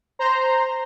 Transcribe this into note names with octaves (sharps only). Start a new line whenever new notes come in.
C5 A#5 C6